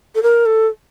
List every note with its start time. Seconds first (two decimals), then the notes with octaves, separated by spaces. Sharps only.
0.15 A4
0.23 A#4
0.46 A4